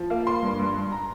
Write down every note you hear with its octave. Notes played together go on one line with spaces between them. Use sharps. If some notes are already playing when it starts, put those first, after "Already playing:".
Already playing: F3
A#3 F5
A#3 C6
G2
G2
G2
A#5